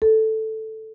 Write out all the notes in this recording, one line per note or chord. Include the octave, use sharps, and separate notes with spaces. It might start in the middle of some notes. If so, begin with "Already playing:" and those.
A4